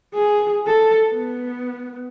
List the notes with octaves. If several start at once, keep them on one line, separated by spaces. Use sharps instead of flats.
G#4
A4
B3